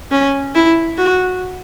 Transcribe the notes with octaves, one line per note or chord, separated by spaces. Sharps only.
C#4
E4
F#4